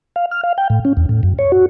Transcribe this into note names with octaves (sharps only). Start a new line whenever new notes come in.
F5
F6
F5
G5
A2
C#4
E2
A2
F#2
C#5
F#4